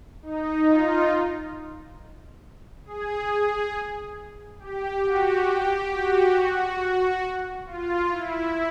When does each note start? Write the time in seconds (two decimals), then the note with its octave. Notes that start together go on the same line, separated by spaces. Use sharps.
0.22 D#4
0.66 F4
2.85 G#4
3.28 G#4
4.59 G4
5.04 F#4
5.47 G4
5.92 F#4
6.34 F#4
7.66 F4
8.10 E4